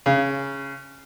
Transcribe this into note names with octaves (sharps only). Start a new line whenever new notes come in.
C#3